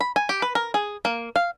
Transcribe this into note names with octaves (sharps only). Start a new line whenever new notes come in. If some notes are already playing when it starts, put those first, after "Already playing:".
B5
G#5
G4
B4
A#4
G#4
A#3
F5